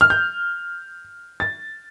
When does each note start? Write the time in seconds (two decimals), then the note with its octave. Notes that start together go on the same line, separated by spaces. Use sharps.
0.01 F6
0.10 G6
1.40 A6